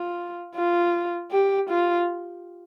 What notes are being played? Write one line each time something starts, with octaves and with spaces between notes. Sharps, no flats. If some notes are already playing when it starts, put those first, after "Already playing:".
Already playing: F4
F4
G4
F4